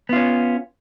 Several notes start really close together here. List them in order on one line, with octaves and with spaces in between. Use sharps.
B3 F4 C#4